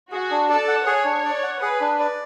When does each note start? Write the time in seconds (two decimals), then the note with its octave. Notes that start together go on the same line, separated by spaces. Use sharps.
0.11 F#4 G#4
0.31 D4
0.49 A4 D5
0.68 F#5
0.86 G#4 C#5
1.05 D4
1.25 D5
1.43 F#5
1.61 G#4 B4
1.81 D4
1.99 D5